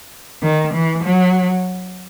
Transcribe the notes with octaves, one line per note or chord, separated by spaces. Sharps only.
D#3
E3
F#3